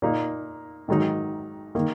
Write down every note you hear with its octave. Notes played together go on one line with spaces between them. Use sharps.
A#2 A#3 D#4
G#1 G#2 D#3 F#3 D#4
D#3 A#3